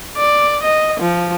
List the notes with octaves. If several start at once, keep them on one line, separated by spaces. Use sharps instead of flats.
D5
D#5
F3